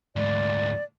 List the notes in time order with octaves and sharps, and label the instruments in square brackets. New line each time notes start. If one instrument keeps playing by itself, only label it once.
[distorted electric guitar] D2 G#2 [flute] D5